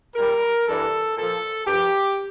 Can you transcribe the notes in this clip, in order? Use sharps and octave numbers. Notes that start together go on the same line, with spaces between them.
A#2 G3 A#4
G2 E3 G3 A4
A#2 F3 A4
G2 F3 G4